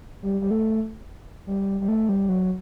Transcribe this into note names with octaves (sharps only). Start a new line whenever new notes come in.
G3
G3
A3
G3
G3
A3
G3
F#3